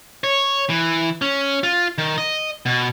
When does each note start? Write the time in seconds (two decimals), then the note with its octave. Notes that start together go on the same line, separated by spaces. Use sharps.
0.24 C#5
0.70 E3
1.22 C#4
1.63 F4
1.98 D#3
2.18 D#5
2.66 B2